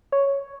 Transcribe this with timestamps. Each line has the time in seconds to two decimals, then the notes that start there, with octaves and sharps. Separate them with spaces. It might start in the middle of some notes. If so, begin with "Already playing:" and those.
0.12 C#5